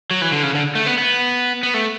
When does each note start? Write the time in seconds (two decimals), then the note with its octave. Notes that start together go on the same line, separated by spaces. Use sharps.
0.11 F#3
0.22 E3
0.32 D3
0.43 C#3
0.55 D3
0.75 A3
0.86 B3
0.98 B3
1.63 B3
1.74 A3